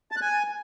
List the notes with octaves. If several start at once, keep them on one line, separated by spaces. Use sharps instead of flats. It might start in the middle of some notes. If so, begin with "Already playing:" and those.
A5
F#6
G#5